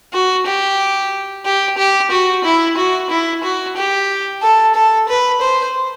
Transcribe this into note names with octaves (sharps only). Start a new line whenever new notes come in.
F#4
G4
G4
G4
F#4
E4
F#4
E4
F#4
G4
A4
A4
B4
C5